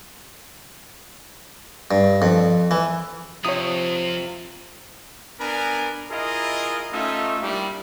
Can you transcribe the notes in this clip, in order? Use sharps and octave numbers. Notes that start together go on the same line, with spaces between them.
G2
F2
E3
F2 C3 F4 C#5 D#6
B3 D4 A#4 G#5 B5
E4 F4 G#4 A#4 D#5
A3 C#4 D#4 F4 E5
G3 A#3 D4 E4 G4